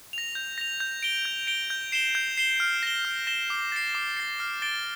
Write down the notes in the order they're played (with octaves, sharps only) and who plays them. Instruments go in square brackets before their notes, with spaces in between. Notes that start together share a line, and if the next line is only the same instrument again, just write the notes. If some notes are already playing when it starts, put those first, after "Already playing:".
[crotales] A#6 F7
G6
A#6 F7
G6
D7 G7
G6
D7 G7
G6
C7 E7 G7
G6
C7 E7 G7
F6
A#6 E7 G7
F6
A#6 E7 G7
D6
A6 C7
D6
A6 C7
F6
A6 D7 G7